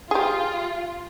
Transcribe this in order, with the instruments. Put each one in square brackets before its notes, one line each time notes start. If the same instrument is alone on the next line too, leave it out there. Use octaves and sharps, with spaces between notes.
[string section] F4 [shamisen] G4 G#4